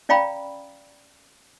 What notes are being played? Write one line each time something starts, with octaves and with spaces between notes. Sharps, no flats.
C#4 D5 F5 G5 A#5 B5